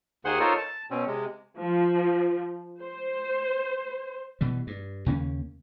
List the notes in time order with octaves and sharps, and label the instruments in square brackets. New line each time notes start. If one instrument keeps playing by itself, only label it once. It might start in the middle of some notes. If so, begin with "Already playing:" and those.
[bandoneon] D#2 D#3 G#4 C5 F#5 C6
D#4 F4 A4 A#4 C5 C#5
A5
B2 C4 C#4
C3 G#3
[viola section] F3
C5
[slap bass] B2 E3 G3
G2
D#2 C#3 A#3 C#4